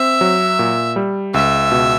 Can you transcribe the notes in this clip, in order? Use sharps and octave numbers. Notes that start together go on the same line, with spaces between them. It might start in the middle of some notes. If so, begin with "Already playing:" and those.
Already playing: C4 E5
F#3
A#2
G3
C#2 E5
B2